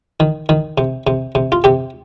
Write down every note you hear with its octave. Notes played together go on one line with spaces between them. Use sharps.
D#3
D#3
C3
C3
C3
F4
C3 G4